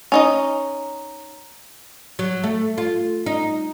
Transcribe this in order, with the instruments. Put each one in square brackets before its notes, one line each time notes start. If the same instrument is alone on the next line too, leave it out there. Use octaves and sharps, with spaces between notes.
[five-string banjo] C#4 D#4 D#5
[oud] F#3
A3
F4
D#4